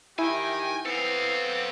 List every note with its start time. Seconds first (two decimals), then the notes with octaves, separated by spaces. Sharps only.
0.19 D#3 E4 G4 G5 G#5
0.86 B3 C4 A4 F5